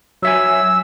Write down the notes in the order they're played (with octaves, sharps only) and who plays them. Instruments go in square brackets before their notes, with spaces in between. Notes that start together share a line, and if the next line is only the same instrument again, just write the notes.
[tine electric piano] F#3 E5 G#5 [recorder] E6